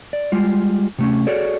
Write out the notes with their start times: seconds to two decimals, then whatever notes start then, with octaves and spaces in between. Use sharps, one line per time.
0.13 D5
0.32 G3 G#3 F4
0.98 C3 A3 C#4
1.27 F#4 G#4 A4 C#5 D5